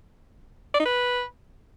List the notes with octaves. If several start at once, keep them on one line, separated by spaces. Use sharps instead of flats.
D5
D#4
B4